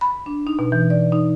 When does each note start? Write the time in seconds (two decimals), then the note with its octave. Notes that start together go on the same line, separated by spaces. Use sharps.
0.01 B5
0.26 D4
0.47 D#4
0.59 B2
0.72 E3
0.90 D5
1.12 D#4